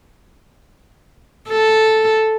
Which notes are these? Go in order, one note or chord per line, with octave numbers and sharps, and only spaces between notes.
A4